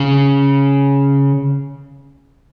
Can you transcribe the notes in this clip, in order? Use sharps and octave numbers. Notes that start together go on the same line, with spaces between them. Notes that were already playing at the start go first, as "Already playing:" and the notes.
Already playing: C#3